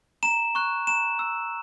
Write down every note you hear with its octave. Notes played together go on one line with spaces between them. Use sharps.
A#5 E7
C#6 F#6
A#5 E7
E6